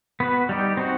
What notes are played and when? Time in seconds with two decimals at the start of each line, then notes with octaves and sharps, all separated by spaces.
0.20 B3 F#4 B4
0.49 G3 D#4 G4
0.77 C4 D#4 F#4